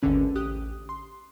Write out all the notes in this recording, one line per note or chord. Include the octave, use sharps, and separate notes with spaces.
G#1 D#2 D3 C#4 B4
A1 G4 D#6 F#6
C6